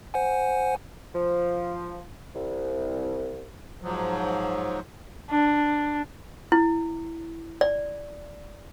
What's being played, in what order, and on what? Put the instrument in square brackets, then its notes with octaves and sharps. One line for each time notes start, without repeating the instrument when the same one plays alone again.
[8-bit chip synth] C5 F#5 G#5
[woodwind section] F3
C2
[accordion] G#2 F3 F#3
[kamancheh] D4
[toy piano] E4
D5